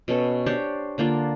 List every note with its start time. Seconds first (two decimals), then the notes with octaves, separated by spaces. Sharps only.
0.08 B2 C#4 A4 C#5
0.46 D4 G4 C5 C#5
0.98 D3 A#3 D4 F4